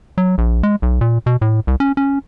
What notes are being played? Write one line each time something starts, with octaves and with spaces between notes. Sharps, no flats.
F#3
A#1
G#3
B1
A#2
B2
A2
C2
C#4
C#4